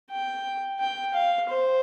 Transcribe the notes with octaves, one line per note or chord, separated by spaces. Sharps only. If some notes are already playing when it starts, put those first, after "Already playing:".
G5
G5
F5
C5